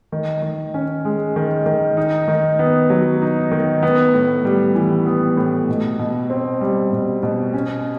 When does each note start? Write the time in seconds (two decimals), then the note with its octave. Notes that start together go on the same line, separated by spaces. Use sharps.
0.12 D#3
0.42 D#3
0.74 C#4
1.05 G#3
1.36 D#3
1.66 D#3
1.97 D#4
2.28 D#3
2.59 B3
2.90 F#3
3.22 D#4
3.51 D#3
3.83 B3
4.14 A2
4.45 G3
4.75 E3
5.06 B3
5.37 A2
5.69 B2
5.99 B2
6.30 C4
6.61 G3
6.93 B2
7.23 B2
7.54 C#4